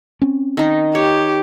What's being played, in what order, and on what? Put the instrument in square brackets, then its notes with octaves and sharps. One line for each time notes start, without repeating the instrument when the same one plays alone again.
[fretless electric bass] C4 C#4
[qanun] D#3 D#4
[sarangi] G4 [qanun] C#5